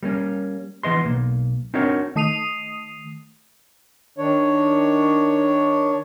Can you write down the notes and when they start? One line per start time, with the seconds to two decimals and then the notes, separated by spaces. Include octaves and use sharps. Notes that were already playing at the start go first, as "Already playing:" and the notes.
0.03 G3 A#3 C#4
0.83 E3 B3 D#5 C6
1.05 B1 A#3
1.74 C4 D4 D#4 F#4 A#4 C#5
2.16 D#3 A3 D#6 C7 D#7 F7
4.18 D#3 D4 C#5